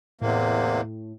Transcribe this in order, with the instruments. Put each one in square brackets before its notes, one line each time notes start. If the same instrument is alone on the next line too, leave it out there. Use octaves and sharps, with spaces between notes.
[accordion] E2 C3 A#3 [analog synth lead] A2